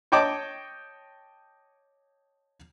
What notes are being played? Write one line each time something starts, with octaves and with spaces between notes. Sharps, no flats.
C#5 D#5 G5 A5 D6